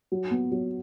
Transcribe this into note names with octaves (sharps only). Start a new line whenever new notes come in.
F#3
B3
F#3